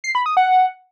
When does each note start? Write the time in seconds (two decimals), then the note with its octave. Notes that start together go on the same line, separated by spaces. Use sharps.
0.04 C7
0.15 B5
0.26 D#6
0.37 F#5